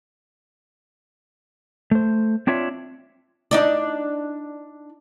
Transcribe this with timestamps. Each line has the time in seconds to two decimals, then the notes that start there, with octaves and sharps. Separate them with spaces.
1.91 A3 C5
2.47 C4 D4 F4 C#5 E5
3.51 D4 D#4 D5